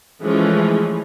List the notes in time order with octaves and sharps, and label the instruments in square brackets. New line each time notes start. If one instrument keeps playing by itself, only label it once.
[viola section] E3 F3 G#3 A3 C#4 B4